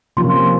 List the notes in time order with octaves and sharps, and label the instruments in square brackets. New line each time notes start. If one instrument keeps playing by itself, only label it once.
[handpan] C3 F3 A#3 C#4 F4 [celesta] C6